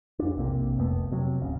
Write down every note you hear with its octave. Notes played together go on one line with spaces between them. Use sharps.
F2 D4
B1 C3 A#3
F1 F2 A3 B3
C3 F#3
D1 G1 C#3